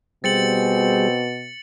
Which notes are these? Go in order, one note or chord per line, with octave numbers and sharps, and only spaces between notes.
B2 G3 C4 G#4 A6 C#7 F#7